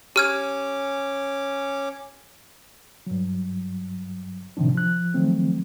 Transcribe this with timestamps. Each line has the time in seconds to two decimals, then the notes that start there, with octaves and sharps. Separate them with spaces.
0.16 C#4 G4 C#5 D6 F6 G#6
3.07 G2 F#3
4.57 A2 C3 D#3 F3 D4
4.75 F3 F#6
5.14 D#3 F3 F#3 A3 C4